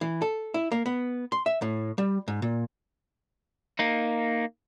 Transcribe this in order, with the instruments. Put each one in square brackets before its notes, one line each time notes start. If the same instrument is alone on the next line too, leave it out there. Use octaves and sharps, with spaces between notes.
[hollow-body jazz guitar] E3
A4
E4
A#3
B3
C6
E5
A2
G3
G#2
A#2
[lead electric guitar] A#3 D#4